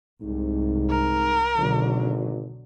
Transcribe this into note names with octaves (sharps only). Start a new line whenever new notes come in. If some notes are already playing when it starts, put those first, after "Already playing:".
C2 G#2
A#4
G#1 B2 D3 F#3